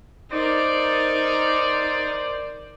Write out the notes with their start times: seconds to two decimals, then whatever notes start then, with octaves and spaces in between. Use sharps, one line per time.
0.31 D#4 A#4 C5 D5